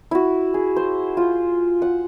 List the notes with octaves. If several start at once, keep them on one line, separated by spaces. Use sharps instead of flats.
E4 F#4
G#4
C5
F4
F#5